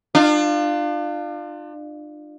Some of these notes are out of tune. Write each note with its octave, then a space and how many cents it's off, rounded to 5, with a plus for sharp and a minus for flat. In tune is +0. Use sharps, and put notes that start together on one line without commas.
D4 +35 F4 +0